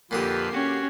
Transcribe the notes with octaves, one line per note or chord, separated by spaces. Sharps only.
F2 A#2 D3 F3 G4 B4 D#6 C7
C#4 F#4